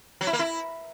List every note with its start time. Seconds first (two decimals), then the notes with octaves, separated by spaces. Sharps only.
0.21 F#3
0.27 E4
0.33 A#3
0.39 E4